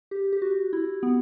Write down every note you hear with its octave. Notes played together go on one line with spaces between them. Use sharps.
G4
G4
F#4
E4
B3